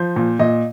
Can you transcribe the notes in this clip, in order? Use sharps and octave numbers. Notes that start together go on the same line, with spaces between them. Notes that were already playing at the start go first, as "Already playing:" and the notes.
Already playing: F3 C5
A#2
A#2 D#5